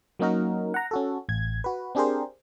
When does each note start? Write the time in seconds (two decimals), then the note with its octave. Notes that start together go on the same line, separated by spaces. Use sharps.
0.19 F#3 A#3 C#4 D#4 F#4 A#4
0.74 F#5 A#5
0.91 C#4 F#4 A4
1.29 A1 G#6
1.64 F#4 B4
1.95 C4 D4 G4 G#4 A#4 C5